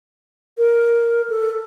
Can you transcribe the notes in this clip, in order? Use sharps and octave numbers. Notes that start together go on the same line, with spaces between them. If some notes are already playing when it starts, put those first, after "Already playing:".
A#4
A4